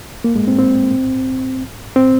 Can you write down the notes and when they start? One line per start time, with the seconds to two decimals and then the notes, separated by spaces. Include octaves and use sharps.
0.24 A#3
0.36 G#3
0.48 C4
0.59 C4
1.96 C4